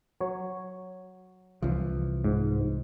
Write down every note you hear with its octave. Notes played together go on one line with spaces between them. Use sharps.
F#3 C#5
C2 E3 F3
G#2